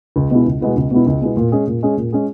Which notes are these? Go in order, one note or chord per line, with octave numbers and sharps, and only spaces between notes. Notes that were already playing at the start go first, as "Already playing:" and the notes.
C#2
B2 G#3 B3 E4
C#2
B2 G#3 B3 E4
C#2
B2 G#3 B3 E4
C#2
B2 G#3 B3 E4
A#2
G#3 C#4 G#4
A#2
G#3 C#4 G#4
A#2
G#3 C#4 G#4